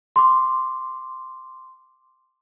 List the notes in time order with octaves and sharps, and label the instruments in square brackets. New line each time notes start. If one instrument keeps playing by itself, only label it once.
[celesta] C6 D6